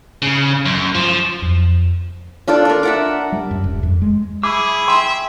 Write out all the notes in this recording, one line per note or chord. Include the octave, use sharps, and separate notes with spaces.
C#3
F#2
F3
F2
D4 F4 A4 D5
D4 A#4
E5 F#5 D6
G3
F#2
D#1
F2
G#3
E4 G#4 B5 D6 E6
E5 G5 C6